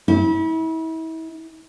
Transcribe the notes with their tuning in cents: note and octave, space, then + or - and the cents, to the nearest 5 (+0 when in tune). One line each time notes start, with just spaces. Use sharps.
E4 -35